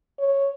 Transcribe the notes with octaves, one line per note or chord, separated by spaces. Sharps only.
C#5